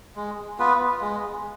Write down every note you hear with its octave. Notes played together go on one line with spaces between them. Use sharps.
G#3
B3 F4 B4
G#3